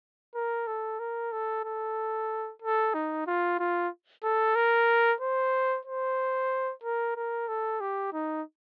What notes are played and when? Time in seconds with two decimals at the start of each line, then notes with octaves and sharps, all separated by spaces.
0.35 A#4
0.67 A4
1.00 A#4
1.32 A4
1.64 A4
2.62 A4
2.94 D#4
3.27 F4
3.59 F4
4.24 A4
4.56 A#4
5.21 C5
5.85 C5
6.83 A#4
7.16 A#4
7.48 A4
7.81 G4
8.13 D#4